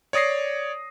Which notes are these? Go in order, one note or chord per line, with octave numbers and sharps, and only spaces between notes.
C#5 D5 D#6 A#6 C7